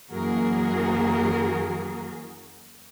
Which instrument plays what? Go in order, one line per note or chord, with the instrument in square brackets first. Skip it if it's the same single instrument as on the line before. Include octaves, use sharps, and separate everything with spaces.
[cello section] F#2 E3 A#3 F#4 G#4 A#4